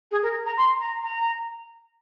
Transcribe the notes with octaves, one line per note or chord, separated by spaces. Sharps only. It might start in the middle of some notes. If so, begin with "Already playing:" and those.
G#4
A#4
A#5
C6
A#5
A#5